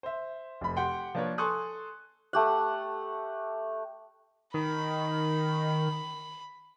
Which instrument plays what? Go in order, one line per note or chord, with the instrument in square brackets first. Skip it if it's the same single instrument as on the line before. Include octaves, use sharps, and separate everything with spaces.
[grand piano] C5 E5
F1 B5
G4 F#5 G5 C6
F3 A#3 D4 A#4 B4 C#5
A4 G#5 C6 C#6 D#6 F#6
[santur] A3 G4 F#5
[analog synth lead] D#3 [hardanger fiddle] B5